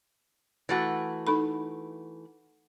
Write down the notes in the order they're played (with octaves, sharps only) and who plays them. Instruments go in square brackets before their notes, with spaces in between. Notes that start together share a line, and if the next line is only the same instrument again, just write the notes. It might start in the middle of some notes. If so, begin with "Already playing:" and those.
[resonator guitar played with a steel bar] E3 A3 F#4
[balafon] D#4 A4 B5